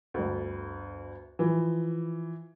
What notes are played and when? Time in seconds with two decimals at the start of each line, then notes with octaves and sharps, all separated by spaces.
0.14 G1 D2
1.39 E3 F3